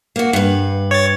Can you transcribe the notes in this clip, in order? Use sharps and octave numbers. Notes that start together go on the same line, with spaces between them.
A#3 F#4
G2 B4
C#5 A6